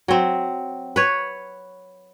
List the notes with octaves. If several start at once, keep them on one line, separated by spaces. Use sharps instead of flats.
F#3 C4
B4 C#5